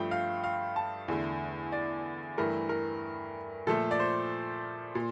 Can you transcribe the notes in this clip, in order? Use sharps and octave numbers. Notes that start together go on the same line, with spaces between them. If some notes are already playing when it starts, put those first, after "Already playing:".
Already playing: G2 F3 A3 G5
F5
F5
A5
E2 D3 A3
D5
G2 E3 A3 A#4
A#4
A#2 F3 A3 A4
D5
C5
A#2